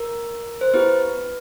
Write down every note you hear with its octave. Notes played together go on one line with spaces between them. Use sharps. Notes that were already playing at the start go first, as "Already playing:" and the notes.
Already playing: A#4
C5
B3 E4 G4 B4